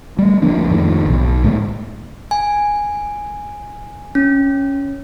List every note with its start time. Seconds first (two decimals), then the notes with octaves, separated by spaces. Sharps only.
0.19 G3 A3
0.42 D2 F3 A#3 D4
0.68 F2 A2 D#3
1.07 B1
1.43 D2 A2 G#3
2.31 G#5
4.15 C#4